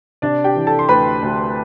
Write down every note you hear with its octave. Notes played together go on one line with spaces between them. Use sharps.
C3 D4 D5
G4 G5
E3
A4 A5
C6
D2 B4 B5
D2